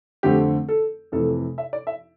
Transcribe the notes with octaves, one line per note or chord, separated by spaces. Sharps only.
F2 D3 A3 C4 G4
A4
F2 C3 E3 A3 A4
E5
D5
E5